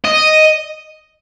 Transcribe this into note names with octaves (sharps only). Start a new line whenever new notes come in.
D#5